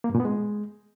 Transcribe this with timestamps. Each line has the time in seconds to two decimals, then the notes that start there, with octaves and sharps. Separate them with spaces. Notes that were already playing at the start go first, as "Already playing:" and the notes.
0.04 A#3
0.09 G2
0.15 A#2
0.20 B3
0.25 G#3